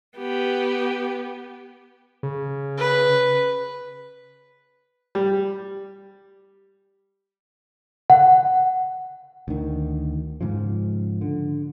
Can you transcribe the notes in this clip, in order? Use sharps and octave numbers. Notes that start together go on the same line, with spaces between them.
B3 G4
C#3
B4
G3
F#5
D2 D#3
G#2 C#3 F3
D3